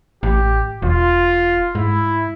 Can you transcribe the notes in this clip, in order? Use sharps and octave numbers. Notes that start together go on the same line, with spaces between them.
A1 G4
E1 F4
G#2 E4